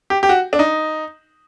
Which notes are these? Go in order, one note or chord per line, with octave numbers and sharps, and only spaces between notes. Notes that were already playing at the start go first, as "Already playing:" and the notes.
G4
G4
F#4
D4
D#4